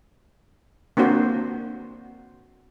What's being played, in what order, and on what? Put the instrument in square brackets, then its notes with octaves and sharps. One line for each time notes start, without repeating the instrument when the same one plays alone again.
[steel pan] A#3 C4 D4 F#4 C5